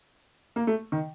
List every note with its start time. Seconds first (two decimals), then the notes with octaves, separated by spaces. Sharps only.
0.56 A#3
0.67 A3
0.92 D#3